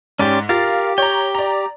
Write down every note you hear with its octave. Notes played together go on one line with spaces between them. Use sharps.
G#2 C#4 G4 D5 D6
F4 G4 A#4 F5 A6
C#5 G5 A#5
D5 A#5